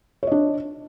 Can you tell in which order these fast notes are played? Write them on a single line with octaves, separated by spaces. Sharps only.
C#5 D#5 D4